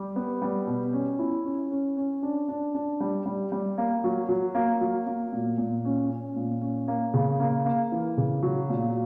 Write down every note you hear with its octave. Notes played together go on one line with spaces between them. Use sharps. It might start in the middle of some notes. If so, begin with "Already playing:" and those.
Already playing: G3 G4
B3
G3
B2
C#4
E4
C#4
C#4
C#4
D4
D4
D4
G3
G3
G3
A#3
F#3
F#3
A#3
F#3
A#3
A#2
A#2
C#4
C#4
A#2
C#4
A#3
C#3
A#3
A#3
E3
C#3
F#3
A#2